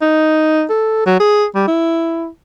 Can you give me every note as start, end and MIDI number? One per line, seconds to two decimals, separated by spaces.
0.02 0.64 63
0.70 1.03 69
1.06 1.19 54
1.20 1.45 68
1.55 1.67 55
1.68 2.27 64